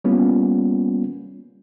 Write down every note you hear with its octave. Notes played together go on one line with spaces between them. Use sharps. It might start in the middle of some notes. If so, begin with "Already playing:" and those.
G3 A#3 B3 C#4 F4